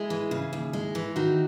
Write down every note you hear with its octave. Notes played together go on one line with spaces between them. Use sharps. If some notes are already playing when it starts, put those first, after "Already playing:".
Already playing: G#3 E4 G#4
E3
C#3
D#2
G#3
E3
D#3 D#4 F#4